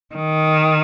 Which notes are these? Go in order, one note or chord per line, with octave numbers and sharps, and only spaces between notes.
D#3